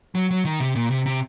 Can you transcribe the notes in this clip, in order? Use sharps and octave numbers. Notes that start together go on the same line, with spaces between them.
F#3
F#3
D#3
C3
A#2
C3
C3